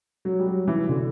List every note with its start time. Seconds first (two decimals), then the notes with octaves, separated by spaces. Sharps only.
0.25 F#3
0.39 G3
0.46 F#3
0.67 E3
0.89 D3